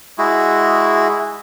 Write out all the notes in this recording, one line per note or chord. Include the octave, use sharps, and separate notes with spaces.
G#3 E4 F#4